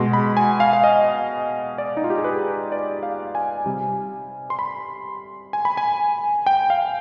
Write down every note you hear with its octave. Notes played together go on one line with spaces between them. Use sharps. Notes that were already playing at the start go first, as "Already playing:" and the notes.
Already playing: B2 G#3 C6
B5
G#5
F5
F5
D#5
D5
D#4
F4
G4
G#4
B4
D5
F5
G#5
C3 G3
C6
B5
G#5
B5
G#5
G5
F5